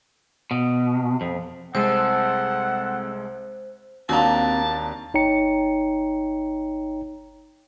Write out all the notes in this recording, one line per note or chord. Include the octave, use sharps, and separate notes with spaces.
B2
F2
C2 G#3 C4 A4 C5 F#5
D#2 A#3 C4 D4 F#4 A5 A#5
G1 D#4 C#5 G5 A#5 C#7